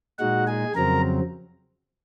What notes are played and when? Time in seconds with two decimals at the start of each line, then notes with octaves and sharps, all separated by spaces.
0.18 A#2 G#3 D#4 F#4 F#5
0.47 G#4 G#5
0.75 F2 C#3 F#3 C4 A#4 A#5